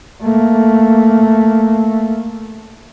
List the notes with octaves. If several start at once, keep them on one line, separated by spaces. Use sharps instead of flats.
A3 A#3